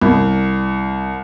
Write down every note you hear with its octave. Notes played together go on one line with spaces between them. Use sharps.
C2